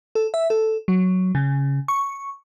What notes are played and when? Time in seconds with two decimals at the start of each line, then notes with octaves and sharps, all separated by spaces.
0.15 A4
0.34 E5
0.50 A4
0.88 F#3
1.35 C#3
1.88 C#6